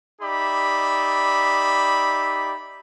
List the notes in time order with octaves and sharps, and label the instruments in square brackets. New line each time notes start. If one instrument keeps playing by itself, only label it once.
[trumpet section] D#4 G4 D5 E5 B5